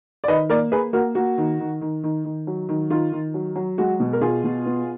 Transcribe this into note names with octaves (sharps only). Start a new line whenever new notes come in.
D5
D#3 B4 D#5
A#3 A#4 D5
A#3 G#4 B4
A#3 F#4 A#4
A#3 F#4
D#3
D#3
D#3
D#3
D#3
F#3
D#3
D#3 F4
D#3
F#3
F#3
G#3 F#4
B2
A#4
B2 F4 G#4
B2
B3